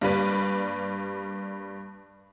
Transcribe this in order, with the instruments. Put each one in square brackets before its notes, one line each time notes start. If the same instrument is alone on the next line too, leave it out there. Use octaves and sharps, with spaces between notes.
[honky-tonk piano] G2 G3 A#3 B4 B6